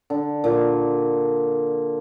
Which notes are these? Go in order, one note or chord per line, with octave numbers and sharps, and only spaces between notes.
D3
A#2